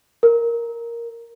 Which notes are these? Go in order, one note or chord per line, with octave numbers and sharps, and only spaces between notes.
A#4